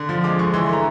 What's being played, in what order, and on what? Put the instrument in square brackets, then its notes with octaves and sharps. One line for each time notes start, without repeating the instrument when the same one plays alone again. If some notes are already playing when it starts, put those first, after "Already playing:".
Already playing: [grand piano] D3
F3
G#3 D6
D3 C#6
E3 C6
A3 A#5